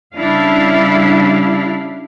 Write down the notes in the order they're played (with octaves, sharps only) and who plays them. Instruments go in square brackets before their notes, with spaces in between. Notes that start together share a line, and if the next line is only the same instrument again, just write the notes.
[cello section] C#3 G3 D4 E4 F5